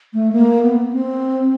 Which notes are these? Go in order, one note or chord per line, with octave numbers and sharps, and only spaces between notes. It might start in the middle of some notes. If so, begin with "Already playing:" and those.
A3
A#3
B3
B3
C4